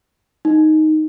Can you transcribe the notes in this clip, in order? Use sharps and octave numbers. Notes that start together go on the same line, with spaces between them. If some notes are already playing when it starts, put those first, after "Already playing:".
D#4